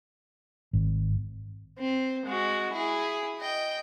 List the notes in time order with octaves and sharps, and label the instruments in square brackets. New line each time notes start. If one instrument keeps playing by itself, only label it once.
[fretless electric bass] G#1
[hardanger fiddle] C4
G#3 F#4
E4 G#4
D#5 G5